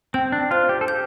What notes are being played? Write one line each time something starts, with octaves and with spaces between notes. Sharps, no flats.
C4 G5
D4
F4 C5
G4
A4
G4 G6